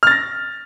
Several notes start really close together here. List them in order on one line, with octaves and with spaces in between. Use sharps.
F6 A6 A#6